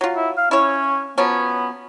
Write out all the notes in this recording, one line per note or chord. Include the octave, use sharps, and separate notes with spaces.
F#3 F4
E4
F5
C#4 E4 C#5
F3 F#3 B3 C#4